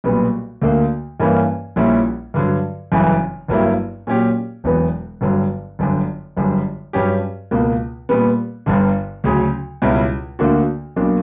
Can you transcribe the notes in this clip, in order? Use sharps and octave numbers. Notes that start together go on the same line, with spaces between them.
B1 A#2 G3 B3
D2 D3 A#3
G2 E3 A#3 C#4
A#1 A#2 G3 C#4 E4
G2 D3 F#3
G1 F#2 C#3 E3
G1 G2 F#3 A#3 E4
A#2 F#3 C#4 G4
E1 E2 B2 F#3 B3
G1 G2 D3 F#3
G1 F#2 D3
G1 F#2 D3 G3
G2 F#3 C#4 G4
C#2 B2 A#3
A#2 G3 B3
G1 G2 D3
D2 C#3 F#3
C#2 B2 G3 C#4 E4
D2 D3 A#3 D4 F#4
B1 B2 A#3 D4